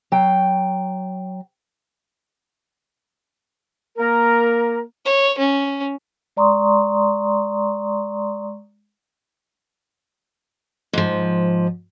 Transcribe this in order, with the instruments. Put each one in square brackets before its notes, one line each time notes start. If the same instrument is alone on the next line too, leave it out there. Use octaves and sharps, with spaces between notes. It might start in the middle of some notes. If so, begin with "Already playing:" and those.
[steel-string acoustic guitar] F#3 G5
[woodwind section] A#3 A#4
[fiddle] C#5
C#4
[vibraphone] G#3 D5 A#5 C6 C#6 D#6
[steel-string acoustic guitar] G#2 F3